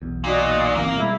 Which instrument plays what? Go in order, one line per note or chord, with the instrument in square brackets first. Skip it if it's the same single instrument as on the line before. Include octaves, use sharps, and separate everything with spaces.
[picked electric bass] B1 E2
[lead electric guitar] A#2 [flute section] D#4 F#4 D5
[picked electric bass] G1 E3 C4 [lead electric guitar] A#3
[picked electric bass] B2 G3 G#3 [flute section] E4